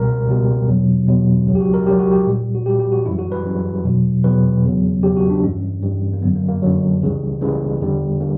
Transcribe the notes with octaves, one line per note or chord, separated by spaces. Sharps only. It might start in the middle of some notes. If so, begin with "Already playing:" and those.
Already playing: C#2 B2 G3 A#4
C#2 B2 G3
E2 B2 F#3
E2 B2 F#3
C#2 C#3 F#3
G4
F#4
A#4
C#2 C#3 F#3 G4
F#4
G4
A#2 G3
F#4
A#2 G3 G4
G4
F#4
F#2 E3 G3 E4
F#4
B4
F#2 E3 G3
E2 B2 F#3
E2 B2 F#3 B4
E2 C#3 F#3
E2 C#3 F#3 G4
F#4
D4
G2 E3 G3 C#4
G2 E3 G3
A#3
F#2 D3 F#3 B3
A#3
A#3
F#2 D3 F#3
C#2 C#3 E3 G3
C#2 C#3 E3 G3 A#3
E2 D3 G3
D3 G3 A#3